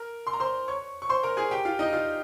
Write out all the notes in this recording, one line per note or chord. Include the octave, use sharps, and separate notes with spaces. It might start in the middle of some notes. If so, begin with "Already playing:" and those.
Already playing: A#4
C6
A#5
C5 C6
C#5 C#6
C#6
C5 C6
A#4 A#5
G#4 G#5
G4 G5
F4 F5
D#4 D#5
F4 F5